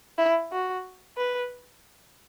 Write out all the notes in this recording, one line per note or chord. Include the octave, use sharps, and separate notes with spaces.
E4
F#4
B4